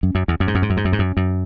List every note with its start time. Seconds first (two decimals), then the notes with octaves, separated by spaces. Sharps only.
0.03 F#2
0.15 F#2
0.28 E2
0.40 F#2
0.47 G#2
0.55 F#2
0.62 G#2
0.70 F#2
0.77 G#2
0.85 F#2
0.93 G#2
0.99 F#2
1.17 F#2